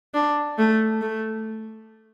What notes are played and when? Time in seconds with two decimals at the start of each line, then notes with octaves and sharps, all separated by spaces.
0.14 D4
0.58 A3
1.02 A3